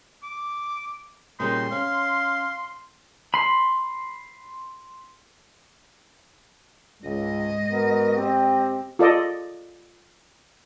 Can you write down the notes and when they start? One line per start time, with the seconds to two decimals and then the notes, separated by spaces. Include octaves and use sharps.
0.23 D6
1.40 A#2 C#3 G3 D#4 C6
1.72 C#4 F5
3.34 B5 C6
7.04 C#2 G#2 D#5
7.72 B3 F#4 A#4
8.17 C4 G4
8.99 F4 A4 D5 D#5